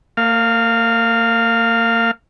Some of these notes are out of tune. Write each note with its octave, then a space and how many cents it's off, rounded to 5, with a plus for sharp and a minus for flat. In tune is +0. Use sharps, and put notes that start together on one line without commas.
A#3 -35 F5 +0